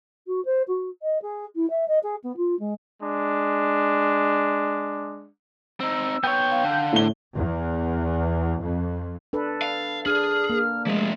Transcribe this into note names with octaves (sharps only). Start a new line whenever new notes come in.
F#4
C5
F#4
D#5
G#4
E4
E5
D#5
G#4
B3
F4
G#3
G#3 D4
C4 D#4 E6
B3 C#5 G5
F5
D3
A2 G7
E2
F2
D4 A4 B4
F5
D4 G#4 F6
A#3
F3 G#3 A3